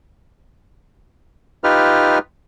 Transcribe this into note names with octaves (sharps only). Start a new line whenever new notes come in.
D#4 F4 G4 B4 F6